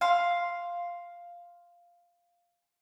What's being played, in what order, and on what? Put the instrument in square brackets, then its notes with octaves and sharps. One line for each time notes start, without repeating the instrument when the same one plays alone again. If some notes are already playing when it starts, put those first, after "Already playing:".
[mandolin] F5 C6